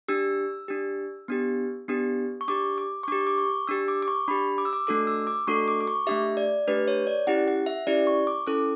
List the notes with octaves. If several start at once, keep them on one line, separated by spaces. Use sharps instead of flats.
D4 G4 E6
D4 G4
B3 D4 G4
B3 D4 G4
C#6
D4 G4 D6
D6
C#6
D4 G4 D6
D6
C#6
D4 G4 E6
D6
D6
C#6
D4 G4 B5
D6
E6
D6
A3 D4 F#4 A4 D6
E6
D6
A3 D4 F#4 A4 C#6
D6
D6
C#6
A3 D4 G4 E5
D5
A3 D4 G4 B4
C#5
D5
C#4 E4 G4 F#5
F#5
E5
C#4 E4 G4 D5
C#6
D6
C#4 E4 A4 D6